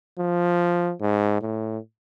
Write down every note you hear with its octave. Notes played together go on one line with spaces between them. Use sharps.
F3
G#2
A2